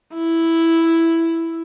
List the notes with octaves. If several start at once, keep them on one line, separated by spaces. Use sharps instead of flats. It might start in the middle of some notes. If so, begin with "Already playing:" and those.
E4